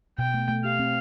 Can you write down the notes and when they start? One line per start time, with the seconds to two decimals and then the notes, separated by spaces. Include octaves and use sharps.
0.18 B2 G5
0.34 A3
0.49 A3
0.64 G4 F5
0.79 C4